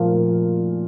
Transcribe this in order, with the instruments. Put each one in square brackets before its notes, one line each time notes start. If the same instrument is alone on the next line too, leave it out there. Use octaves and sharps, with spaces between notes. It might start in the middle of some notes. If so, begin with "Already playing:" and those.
Already playing: [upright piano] A#2 F3 A#3